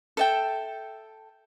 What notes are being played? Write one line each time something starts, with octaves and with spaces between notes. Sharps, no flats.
A4 E5 G5